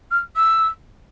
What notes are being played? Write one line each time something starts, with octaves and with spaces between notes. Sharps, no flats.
F6
E6